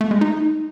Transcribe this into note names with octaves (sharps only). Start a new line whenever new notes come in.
A3
G#3
D#4